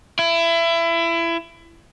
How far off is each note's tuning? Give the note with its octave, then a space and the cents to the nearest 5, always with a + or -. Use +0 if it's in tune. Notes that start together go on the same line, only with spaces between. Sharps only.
E4 +25